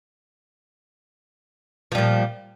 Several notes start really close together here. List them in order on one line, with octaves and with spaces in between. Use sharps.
F3 G3 A#2